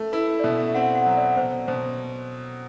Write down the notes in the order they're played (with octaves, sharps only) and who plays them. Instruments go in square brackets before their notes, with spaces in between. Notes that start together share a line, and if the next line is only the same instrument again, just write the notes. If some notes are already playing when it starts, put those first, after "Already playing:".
Already playing: [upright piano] A3
[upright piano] E4 [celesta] B4
[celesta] D5
[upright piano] B2 [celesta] E5
[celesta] E5
[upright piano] C4 [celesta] F#5
[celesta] F#5
[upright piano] F#3
[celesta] D5
[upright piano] B2 [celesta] C5
[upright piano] B2 [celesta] C5